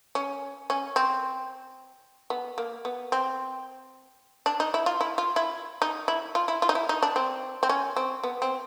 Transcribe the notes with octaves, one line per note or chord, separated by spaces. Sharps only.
C#4
C#4
C4
B3
A#3
B3
C4
D4
D#4
E4
F4
E4
F4
E4
D#4
E4
F4
E4
F4
D#4
E4
D#4
D4
C4
C4
C#4
C4
B3
C4